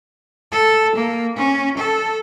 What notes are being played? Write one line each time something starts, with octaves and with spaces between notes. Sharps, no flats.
A4
A#3
C#4
A4